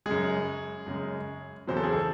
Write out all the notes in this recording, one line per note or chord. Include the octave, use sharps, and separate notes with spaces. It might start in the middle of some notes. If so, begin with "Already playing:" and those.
F#2 C#3 G#3 G#4
F#2 C#3 G#3
E2 C#3 F#3 C5
A4
G#4
A4